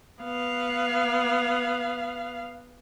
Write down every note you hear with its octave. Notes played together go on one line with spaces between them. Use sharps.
B3 F5